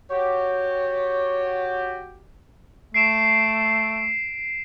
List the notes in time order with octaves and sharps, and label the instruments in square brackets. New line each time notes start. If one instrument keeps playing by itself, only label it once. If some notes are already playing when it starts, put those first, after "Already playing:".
[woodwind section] F#4 G4 [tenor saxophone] C#5
[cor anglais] A3 [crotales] C7 D7 E7